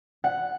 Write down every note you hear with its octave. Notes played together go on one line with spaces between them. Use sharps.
F#5